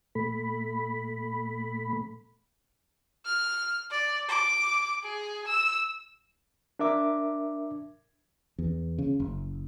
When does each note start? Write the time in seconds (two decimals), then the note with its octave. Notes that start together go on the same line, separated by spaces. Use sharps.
0.15 A#2 A3 B5
3.25 F6
3.91 D5
4.28 D6
5.04 G#4
5.47 E6
6.79 D4 A#4 E5 D6
8.58 E2
8.99 C#3
9.20 F#1